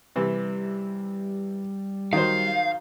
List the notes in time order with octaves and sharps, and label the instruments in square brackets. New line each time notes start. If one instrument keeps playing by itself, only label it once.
[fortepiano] C3 E3 [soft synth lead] G3
[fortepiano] D#3 F#3 C5 [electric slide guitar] F5